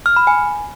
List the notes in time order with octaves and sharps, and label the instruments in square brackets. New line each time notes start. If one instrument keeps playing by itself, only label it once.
[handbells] F6
B5
G#5